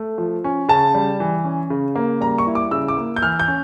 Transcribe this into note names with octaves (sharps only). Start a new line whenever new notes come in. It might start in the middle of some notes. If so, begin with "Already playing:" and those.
Already playing: A3
F3
C#4
C#3 A5
G3
E3
C#4
C#3
A#3
G3 A#5
C#6
E4
D6
C#3 E6
D6
A#3
G6
E3 F6
G6
C#4